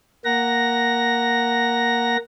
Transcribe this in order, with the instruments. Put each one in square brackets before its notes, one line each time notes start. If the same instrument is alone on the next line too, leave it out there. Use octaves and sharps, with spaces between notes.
[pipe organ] A#3 F#5 A#5 A#6